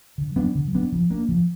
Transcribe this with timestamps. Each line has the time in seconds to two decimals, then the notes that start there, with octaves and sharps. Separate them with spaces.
0.18 D3
0.36 F#3 B3 D4
0.55 D3
0.72 F#3 B3 D4
0.92 F3
1.10 A#3 D4
1.28 F3